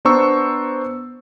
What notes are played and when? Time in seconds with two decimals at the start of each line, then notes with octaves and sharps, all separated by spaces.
0.05 B3 D4 C5 A#5 C#6 E6